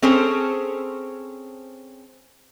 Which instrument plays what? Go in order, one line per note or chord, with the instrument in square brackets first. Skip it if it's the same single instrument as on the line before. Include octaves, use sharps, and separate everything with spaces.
[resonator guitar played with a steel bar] C4 C#4 G#4 A4 C5